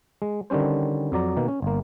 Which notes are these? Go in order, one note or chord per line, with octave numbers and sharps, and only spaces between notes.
G#3
D3 D#3 G3 C#4 C5
F2 F#3 D5 A#5
B2 D#3 A#3
C#4
G1 A#3